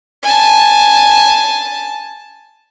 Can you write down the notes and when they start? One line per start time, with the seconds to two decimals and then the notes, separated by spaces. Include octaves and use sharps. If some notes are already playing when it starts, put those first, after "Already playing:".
0.24 G#5 A5